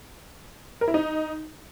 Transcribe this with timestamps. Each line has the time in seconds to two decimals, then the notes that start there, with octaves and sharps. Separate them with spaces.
0.81 A#4
0.88 E4
0.94 D#4